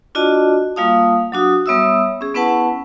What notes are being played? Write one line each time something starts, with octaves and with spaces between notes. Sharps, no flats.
D4 F4 F#4 D5 D#5 A5
G3 A#3 F4 F5 A5 D#6
F#3 D4 F#4 D#6
G3 B3 C#5 E5 D#6 E6
C#4 G#4
B3 C#4 E4 B4 F#5 A5